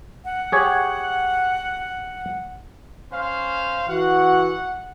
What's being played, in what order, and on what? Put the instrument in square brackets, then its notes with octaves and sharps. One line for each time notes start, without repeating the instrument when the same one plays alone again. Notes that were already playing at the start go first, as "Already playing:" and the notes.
[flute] F#5
[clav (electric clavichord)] G4 G#4 C#5
[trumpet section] C#4 C5 F5
[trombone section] E3 F#4 [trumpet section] F#5